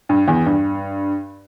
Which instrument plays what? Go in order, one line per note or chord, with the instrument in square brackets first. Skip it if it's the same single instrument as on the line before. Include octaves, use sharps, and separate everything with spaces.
[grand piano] G2
E2
G2